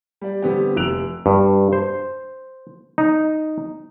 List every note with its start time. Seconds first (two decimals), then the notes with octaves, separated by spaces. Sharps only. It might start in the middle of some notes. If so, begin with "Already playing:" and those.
0.21 G3 D5
0.42 D3 G3 B3 C4 G4
0.77 F1 E6 F#6 D7 F7
1.26 G2
1.73 C5
2.98 D#4